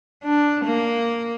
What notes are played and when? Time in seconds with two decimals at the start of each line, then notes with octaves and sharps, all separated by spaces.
0.24 D4
0.65 A#3